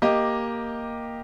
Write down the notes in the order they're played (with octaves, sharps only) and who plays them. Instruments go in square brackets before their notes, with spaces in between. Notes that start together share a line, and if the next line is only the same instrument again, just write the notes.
[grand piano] A#3 G4 D#5